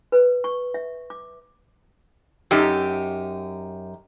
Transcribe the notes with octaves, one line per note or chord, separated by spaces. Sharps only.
B4
C#6
E5
D6
F#2 D#4 G4